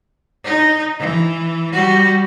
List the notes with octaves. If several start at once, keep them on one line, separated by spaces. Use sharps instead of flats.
D#4
E3
G3 F#4